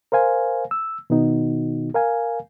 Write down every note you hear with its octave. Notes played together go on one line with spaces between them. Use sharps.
A#4 C5 F5 G#5
E6
B2 D#3 B3 D#4 F#4
A#4 F5 G#5